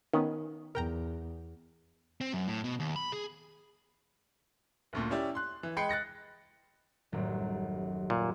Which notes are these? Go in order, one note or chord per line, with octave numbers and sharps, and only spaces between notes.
D#3 B3 C#4
E2 A#4 G5 A#5
C4
F#2
A2
B2
D#2
B5
G#4
F#1 D2 A#2
C#4 E4 G4 D5
C6 F#6
E3
G#3 G5 B5 C7 C#7
F#6 A6 A#6 C#7
D#1 A1 F#2
A#2